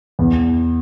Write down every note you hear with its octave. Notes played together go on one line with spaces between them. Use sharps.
E2